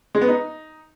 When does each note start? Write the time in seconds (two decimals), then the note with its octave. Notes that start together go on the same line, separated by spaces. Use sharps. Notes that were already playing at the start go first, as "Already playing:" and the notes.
0.15 G#3
0.21 B3
0.28 D#4